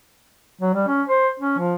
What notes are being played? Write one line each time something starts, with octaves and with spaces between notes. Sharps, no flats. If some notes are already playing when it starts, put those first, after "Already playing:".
F#3
G3
C#4
C5
C#4
F3